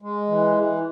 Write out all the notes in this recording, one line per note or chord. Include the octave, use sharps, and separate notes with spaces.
G#3
E3
E3